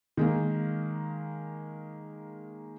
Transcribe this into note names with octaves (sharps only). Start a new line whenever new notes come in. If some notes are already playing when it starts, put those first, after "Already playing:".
D#3 G#3 A#3